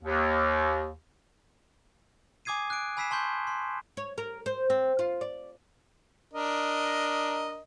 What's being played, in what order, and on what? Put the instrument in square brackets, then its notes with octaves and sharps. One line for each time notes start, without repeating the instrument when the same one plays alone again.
[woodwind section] D#2
[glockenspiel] G#5 D6 D#6 G#6 C7 D#7
F#6 D7
G#5 B5 E6 B6 C7 E7
A5 C6 C#6 G6
C6
[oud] C#5
A#4
C5
C4
F4
D5
[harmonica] D4 A#4 D#5